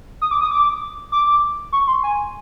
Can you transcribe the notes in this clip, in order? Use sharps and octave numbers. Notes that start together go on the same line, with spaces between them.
D#6
D6
D#6
D6
D6
C#6
C6
G#5